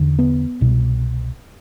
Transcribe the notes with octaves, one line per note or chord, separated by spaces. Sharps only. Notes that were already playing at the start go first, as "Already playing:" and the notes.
Already playing: E2 D3
B3
C2 B2